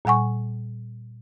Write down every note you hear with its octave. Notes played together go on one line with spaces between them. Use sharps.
A#2 G3 F#5 G#5 C#6